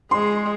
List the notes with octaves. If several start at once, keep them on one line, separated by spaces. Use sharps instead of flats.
G#3 C6